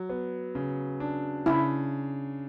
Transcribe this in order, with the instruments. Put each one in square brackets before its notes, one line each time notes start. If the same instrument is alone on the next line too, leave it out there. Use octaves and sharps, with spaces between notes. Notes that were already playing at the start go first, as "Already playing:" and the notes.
Already playing: [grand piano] F#3
B3
C#3
D4
[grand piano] C#3 [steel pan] E4